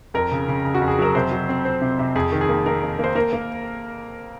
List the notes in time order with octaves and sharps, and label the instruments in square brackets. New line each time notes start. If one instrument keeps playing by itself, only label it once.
[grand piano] F2 A#4
C#3
C#3
C#3
F#4
F2
G#4
F#3 A#4
C3 C5
F#3
C4
C4
C3
C3
F2 G#4
D#3
G#4
A#3
A#3 A#4
F2
A#3 C5
A#3 A#4
A#3